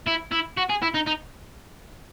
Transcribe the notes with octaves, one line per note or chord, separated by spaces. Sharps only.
E4
E4
F#4
G#4
E4
D#4
D#4